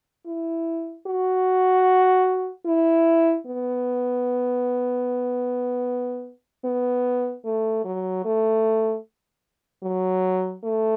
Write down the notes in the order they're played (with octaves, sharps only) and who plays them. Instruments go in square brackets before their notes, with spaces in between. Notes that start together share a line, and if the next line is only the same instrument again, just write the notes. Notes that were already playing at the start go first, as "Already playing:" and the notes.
[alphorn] E4
F#4
E4
B3
B3
A3
F#3
A3
F#3
A3